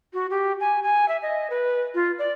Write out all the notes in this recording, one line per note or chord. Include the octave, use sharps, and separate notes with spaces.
F#4
G4
G#5
G#5
E5
D#5
B4
F4
D5